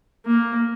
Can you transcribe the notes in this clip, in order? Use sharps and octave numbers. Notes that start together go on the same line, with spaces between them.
A#3